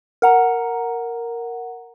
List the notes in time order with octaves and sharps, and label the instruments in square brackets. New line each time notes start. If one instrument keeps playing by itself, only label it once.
[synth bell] A#4 F#5 A#5